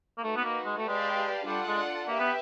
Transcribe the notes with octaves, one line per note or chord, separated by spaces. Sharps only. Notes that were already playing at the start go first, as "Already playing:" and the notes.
A#3
A3 D#4 F#4 B4
B3
A#3
G#3
A3
G#3 G4 B4 D5 F5 A5
G3 D4 F4 A4 D5 F#5
G#3
A#3 G4 B4 E5
B3